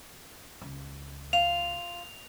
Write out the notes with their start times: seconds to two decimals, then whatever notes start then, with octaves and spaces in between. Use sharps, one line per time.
0.62 C#2
1.33 F4 F7